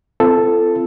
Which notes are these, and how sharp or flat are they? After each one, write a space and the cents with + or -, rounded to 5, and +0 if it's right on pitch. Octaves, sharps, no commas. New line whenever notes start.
C4 -30 F4 -35 A4 +0